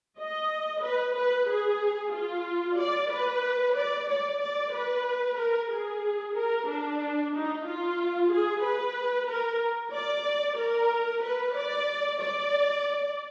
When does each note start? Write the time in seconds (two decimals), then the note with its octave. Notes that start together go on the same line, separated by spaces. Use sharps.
0.18 D#5
0.83 B4
1.15 B4
1.48 G#4
2.13 F4
2.78 D5
3.11 B4
3.75 D5
4.08 D5
4.40 D5
4.73 B4
5.38 A#4
5.71 G#4
6.36 A#4
6.67 D4
7.33 D#4
7.65 F4
8.30 G#4
8.63 B4
9.28 A#4
9.93 D5
10.58 A#4
11.23 B4
11.55 D5
12.20 D5